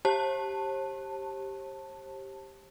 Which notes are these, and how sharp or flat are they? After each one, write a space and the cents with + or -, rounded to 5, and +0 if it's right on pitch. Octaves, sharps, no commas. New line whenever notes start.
G4 +0 C5 +45 A5 +10